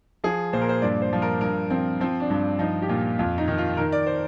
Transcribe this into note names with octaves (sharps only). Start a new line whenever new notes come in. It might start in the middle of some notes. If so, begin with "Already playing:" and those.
F3 G#4
A#2 C5
A#4
C5
G2 D5
C5
F3
A#4
G2 A#4
F3 C4
F3 C4
D4
G2
F3 D#4
G4
A#2 F4
F2 F4
D#4
D#3
F4
D#3 A#4
D5
C5